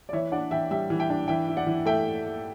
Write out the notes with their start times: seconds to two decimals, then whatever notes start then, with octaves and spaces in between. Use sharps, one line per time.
0.09 D5
0.13 E3 C#5 E5
0.32 D4 D5 F#5
0.51 E3 E5 G5
0.71 G3 E5 G5
0.90 E3
0.99 E5 G5
1.10 D4
1.28 E3 E5 G5
1.48 E4
1.57 D5 F#5
1.67 E3
1.86 A3 E5 G5